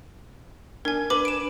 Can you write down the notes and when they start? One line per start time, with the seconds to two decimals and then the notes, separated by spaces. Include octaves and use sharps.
0.85 D4 A#4 G#5 G#6
1.10 B4 D6 F#7
1.25 D7 E7